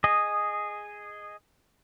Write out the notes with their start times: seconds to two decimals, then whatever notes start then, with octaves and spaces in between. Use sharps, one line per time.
0.04 G#4 D#5